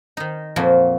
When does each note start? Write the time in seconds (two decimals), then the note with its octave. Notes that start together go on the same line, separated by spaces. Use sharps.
0.17 D#3 D#4
0.56 F2 A#2 F3 F#3